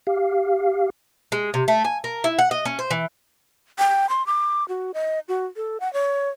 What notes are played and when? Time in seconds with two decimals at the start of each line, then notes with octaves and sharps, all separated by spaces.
0.07 G4 F5
1.32 G#3
1.54 C3
1.68 A3
1.85 G#5
2.04 A#4
2.24 E4
2.39 F#5
2.51 D#5
2.65 C#4
2.79 C5
2.91 E3
3.79 G5
4.09 C6
4.27 D6
4.69 F#4
4.94 D#5
5.28 F#4
5.56 A4
5.80 F#5
5.93 C#5